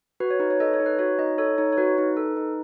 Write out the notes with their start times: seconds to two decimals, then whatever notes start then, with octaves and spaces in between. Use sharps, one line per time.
0.20 F#4 B4
0.31 C#5
0.40 D#4 B4
0.50 C#5
0.60 A4 D#5
0.73 C#5
0.80 D#4
0.86 B4
0.99 F#4 C#5
1.19 D#4 D#5
1.38 A4 C#5
1.58 D#4 C#5
1.72 C#5
1.77 F#4 B4
1.98 D#4
2.17 A4
2.37 D#4